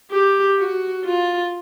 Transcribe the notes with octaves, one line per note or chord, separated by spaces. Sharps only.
G4
F#4
F4